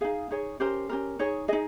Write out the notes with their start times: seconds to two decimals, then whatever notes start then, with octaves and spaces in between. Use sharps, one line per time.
0.01 D#4 G#4 F5
0.31 D#4 G#4 C#5
0.60 C#4 G4 A#4 C5
0.89 C#4 G4 A#4
1.19 D#4 G#4 C#5
1.48 D#4 G#4 D#5